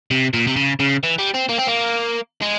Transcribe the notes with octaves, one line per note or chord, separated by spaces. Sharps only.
C3
A#2
C3
C#3
C#3
E3
G3
C4
A#3
C4
A#3
G#3